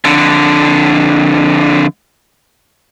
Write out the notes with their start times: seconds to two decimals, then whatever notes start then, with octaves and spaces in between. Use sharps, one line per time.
0.05 F2 D3